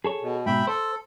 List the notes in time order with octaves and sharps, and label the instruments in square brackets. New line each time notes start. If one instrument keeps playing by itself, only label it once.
[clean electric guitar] G#4 A4 C#5
[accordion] B2
[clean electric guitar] G#2 B2 [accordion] E5 G5 B5
[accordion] A4 [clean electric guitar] C5